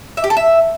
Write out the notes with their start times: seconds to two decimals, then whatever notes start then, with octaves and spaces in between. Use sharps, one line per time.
0.17 E5
0.24 G4
0.30 A4
0.37 E5